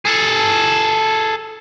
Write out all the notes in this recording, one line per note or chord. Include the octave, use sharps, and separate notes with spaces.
G#4 A4